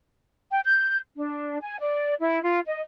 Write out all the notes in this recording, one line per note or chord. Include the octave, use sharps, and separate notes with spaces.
G5
G6
D4
G#5
D5
E4
F4
D#5